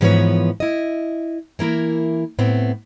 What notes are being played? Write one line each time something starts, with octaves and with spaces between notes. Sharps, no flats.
G#2 E3 F3 B3 B4 C#5
E4 D#5
E3 A#3 E4 A#4
A2 B3 C4